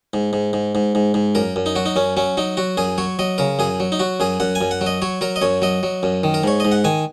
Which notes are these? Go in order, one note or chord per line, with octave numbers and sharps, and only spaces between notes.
G#2
G#2
G#2
G#2
G#2
G#2
F#2 A#4
F#2
D#4
F#3 F#4
D#4
F#2 C#4
F#3 C#4
F#3 D#4
F#3 F#4
F#2 G#4
F#3 C#5
F#3 D#5
C#3 A#4
F#2 G#4
F#3
D#4
F#3 F#4
F#2 G#4
F#2 F#5
G#5
F#2
F#5
F#3
D#5
F#3 C#5
F#3 A#4
D#5
F#2 C#5
F#3 D#5
F#3
F#2
D#3
A#4
G#2 C#5
G#2 D#5
F#5
D#3 G#5